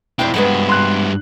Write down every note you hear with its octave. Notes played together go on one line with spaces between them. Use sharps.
F2 C4 D4 E4 G5
G2 F#3 G#3 B3 E4
C6 F#6